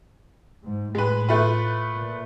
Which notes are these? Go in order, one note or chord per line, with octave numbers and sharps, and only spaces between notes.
G#2
A2 G#3 B4
A3 F4 B4
A#2